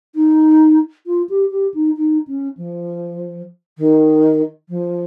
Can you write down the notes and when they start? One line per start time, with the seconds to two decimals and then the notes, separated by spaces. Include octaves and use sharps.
0.15 D#4
1.06 F4
1.29 G4
1.51 G4
1.74 D#4
1.97 D#4
2.27 C#4
2.57 F3
3.78 D#3
4.69 F3